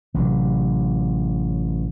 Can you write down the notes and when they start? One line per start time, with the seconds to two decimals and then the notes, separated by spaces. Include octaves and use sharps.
0.14 A1 C3 F#3